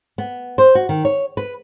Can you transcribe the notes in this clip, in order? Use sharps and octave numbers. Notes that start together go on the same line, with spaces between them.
B3
C5
F#4
D#3
C#5
B4